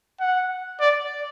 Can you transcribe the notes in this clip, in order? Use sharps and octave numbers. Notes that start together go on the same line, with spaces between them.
F#5
D5